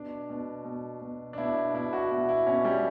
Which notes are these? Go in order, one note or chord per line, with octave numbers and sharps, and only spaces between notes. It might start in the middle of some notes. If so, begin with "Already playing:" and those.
Already playing: B2 D4
B2
B2
B2
D4
B2 E4
B2 E4
F#4
B2 E4
E4
B2 C#4
G3